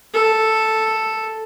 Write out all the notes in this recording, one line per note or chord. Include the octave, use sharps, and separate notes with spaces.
A4